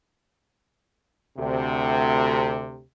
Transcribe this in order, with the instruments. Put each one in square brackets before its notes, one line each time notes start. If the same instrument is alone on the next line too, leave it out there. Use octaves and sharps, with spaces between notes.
[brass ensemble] D2 C3